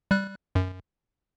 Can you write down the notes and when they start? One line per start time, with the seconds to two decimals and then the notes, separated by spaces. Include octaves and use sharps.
0.11 G3 F#6
0.55 F#2